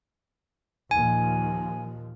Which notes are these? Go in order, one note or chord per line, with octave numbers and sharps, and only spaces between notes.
D#2 A#2 F3 G#5